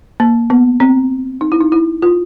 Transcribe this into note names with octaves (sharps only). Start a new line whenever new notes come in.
A#3
B3
C4
D#4
E4
D#4
E4
F4